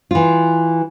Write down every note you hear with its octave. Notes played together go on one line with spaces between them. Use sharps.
E3 F4